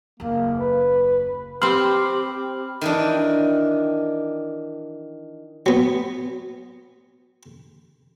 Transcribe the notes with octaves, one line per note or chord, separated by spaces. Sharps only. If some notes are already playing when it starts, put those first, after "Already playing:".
F#1 D#2 A#3
B4
C4 G4 C5 B5 F6 F#7
D#3 E3 D4
F#3 B3